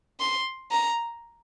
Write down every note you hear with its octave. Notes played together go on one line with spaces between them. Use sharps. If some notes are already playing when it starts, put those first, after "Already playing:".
C6
A#5